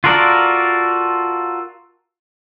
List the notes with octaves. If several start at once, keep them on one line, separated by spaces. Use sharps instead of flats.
F4 F#4 A4 A#4 D5